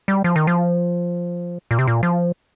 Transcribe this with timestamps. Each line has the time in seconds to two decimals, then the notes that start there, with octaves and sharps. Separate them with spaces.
0.08 G3
0.24 F3
0.36 D#3
0.47 F3
1.71 A#2
1.79 C3
1.87 A#2
2.03 F3